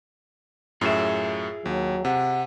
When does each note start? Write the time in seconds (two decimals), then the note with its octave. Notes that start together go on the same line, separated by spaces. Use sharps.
0.81 F#2 A2 F4 G#4 E5
1.66 D#2 F#3
2.05 C3 F#5